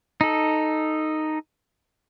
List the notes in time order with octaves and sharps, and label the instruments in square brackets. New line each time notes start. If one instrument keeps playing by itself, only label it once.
[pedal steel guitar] D#4 A4